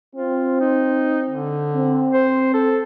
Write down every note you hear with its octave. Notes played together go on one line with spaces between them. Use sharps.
C4 F4
D#4
D3
C4
C5
A4